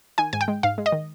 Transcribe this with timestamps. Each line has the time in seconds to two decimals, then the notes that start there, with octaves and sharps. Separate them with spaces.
0.18 D#3 G#5
0.33 G#2 G#5
0.41 G5
0.48 G#3
0.63 G#2 F5
0.78 G#3
0.86 D#5
0.92 D#3